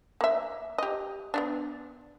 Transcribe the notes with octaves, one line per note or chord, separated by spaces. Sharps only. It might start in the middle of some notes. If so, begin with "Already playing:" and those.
A#3 E5
G4 D#5
B3 C#4 D4